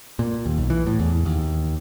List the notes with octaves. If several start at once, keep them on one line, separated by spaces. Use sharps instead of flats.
A#2
D#2
B1
E3
A2
E2
D#2